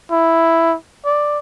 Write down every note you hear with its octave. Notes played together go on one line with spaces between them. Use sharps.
E4
D5